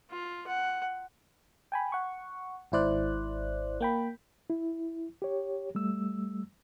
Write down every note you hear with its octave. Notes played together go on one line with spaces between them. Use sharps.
F4
F#5
G5 G#5 B5
F#5 C#6
G#1 G#2 E4 C5 D5 F#6
A#3 G5 B5
E4
G4 C#5
G3 A3 E6